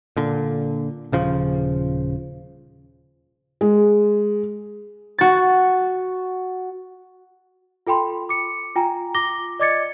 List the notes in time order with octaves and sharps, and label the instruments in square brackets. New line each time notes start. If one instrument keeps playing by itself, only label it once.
[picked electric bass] A#2 D3
D#1 C#3 F3
[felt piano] G#3
[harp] F#4 A6
[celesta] F4 A4 G5 B5 C6
D6 C#7
F4 G5 G#5 A#5
F4 D6 A#6 G7
D5 D#5 D6 G#6 A6 C#7